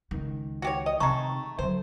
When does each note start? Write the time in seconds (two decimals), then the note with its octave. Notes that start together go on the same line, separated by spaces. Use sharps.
0.11 C#2 D#3
0.62 F#4 G4 C#5
0.86 D#5
1.00 C3 D#3 G#3 A3 G5 A#5 C#6
1.59 D3 F#3 C5